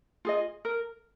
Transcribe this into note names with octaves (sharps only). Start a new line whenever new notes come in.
F4 G#4 D#5
A#4